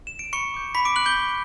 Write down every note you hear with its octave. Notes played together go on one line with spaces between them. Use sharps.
E7
D7
B5 C#6 C#7
D6 G6
B5 C#6 B6
D6 D7
F#6 F#7
G6 G7
C#6